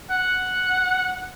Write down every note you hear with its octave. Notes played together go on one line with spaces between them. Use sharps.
F#5